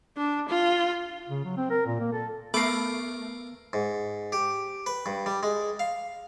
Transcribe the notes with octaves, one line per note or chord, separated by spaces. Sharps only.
D4
F4
C#3
F#3
C4
A#4
A#2
A#3
A4
A3 B3 A#4 B5 D6 C7
G#2
G4
B4
G2
G3
G#3
F5